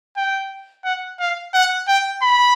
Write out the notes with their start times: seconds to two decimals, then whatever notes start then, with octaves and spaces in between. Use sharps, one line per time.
0.16 G5
0.85 F#5
1.20 F5
1.54 F#5
1.88 G5
2.22 B5